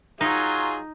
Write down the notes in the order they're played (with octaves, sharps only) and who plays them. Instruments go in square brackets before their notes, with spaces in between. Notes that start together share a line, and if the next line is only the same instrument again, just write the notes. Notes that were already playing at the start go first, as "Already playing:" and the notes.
[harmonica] F#3 F4 G#4 [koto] D#4